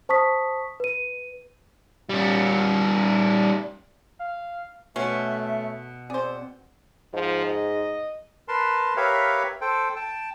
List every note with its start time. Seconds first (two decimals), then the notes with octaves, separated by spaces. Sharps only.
0.09 C5 A5 C#6 D#6 B6
0.80 B4 D#7
2.10 G3 C#4
4.20 F5
4.96 B2 A3 C#4 E5
6.10 C4 G#4 C5 D5
7.14 G#2 F3
7.46 D#5
8.48 A#4 B4 A5 C6
8.97 G4 A#4 B4 C#5 E5 F5
9.61 A4 C5 G5
9.96 G5 A5